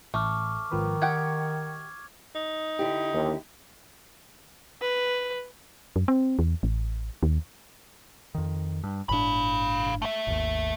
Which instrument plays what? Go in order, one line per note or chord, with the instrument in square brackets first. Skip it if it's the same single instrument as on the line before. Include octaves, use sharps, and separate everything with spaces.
[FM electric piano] A1 [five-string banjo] A3 [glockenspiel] C#6 D6 F6
[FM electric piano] G#1 F3 B4 [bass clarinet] D#3
[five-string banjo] G4 F#5 G5 [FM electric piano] D#5 C#6 [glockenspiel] G#6
[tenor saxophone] D#4
[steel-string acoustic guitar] D3 E4 G4
[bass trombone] D#2
[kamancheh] B4
[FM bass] F#2
C4
E2
A1
D#2
[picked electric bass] F2 D#3
G2
[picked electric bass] G1 A2 D4 [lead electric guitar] F5 B5
[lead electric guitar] A3 E5
[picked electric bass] G#1 D#2